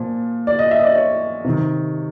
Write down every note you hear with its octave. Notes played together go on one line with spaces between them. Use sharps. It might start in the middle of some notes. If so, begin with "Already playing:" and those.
Already playing: A#2 F3
D5
D#5
E5
D#5
D5
C#5
C3 D#3